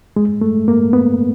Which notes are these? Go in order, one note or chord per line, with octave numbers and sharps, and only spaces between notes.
G#3
A3
A#3
B3